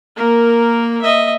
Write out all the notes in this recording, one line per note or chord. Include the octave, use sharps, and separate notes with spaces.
A#3 A#4
D#5 E5